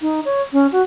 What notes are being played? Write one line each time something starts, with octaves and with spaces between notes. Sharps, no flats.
D#4
C#5
C#4
F#4